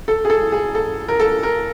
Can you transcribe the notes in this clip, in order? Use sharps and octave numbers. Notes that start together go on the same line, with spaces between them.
A4
G#4
A4
G#4
A4
A#4
A4
A#4